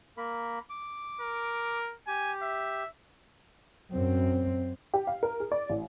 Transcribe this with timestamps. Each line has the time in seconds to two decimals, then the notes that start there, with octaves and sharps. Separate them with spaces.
0.17 A#3 A#4 B5
0.70 D6
1.21 A#4
2.08 G4 G#5
2.43 E5
3.93 F#2 C4
4.94 G4
5.07 F5
5.23 A#4
5.40 G#4
5.52 D5
5.69 A1